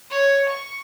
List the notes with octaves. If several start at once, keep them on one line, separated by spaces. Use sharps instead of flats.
C#5
C#6